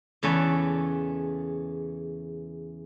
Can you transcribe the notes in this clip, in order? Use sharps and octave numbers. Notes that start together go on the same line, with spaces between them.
E2 C#3 A4 B4 C#5 D5